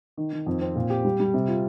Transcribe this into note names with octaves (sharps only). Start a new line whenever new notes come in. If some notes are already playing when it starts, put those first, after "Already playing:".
D#3
D#3
F2
C4
A#2
G4
G3
G3
C3
F4